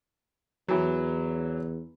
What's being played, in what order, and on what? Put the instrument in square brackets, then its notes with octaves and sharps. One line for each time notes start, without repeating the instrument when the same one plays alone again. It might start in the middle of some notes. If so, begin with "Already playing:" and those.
[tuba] E2 [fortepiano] E3 F#3